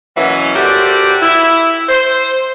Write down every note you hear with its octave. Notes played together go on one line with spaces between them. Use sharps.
B2 E3 F#3 A#3 C#4
F#4 G4 A4 A#4 C5 D5
E4
C5